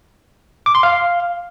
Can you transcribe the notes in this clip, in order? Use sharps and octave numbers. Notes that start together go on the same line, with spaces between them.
D6
C6
F5